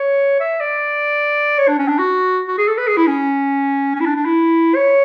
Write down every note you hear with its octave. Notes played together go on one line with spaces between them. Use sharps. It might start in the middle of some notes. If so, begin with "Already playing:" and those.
Already playing: C#5
E5
D5
C#5
D4
C#4
D4
F#4
F#4
G#4
A4
B4
G#4
E4
C#4
C#4
E4
D4
D4
E4
C#5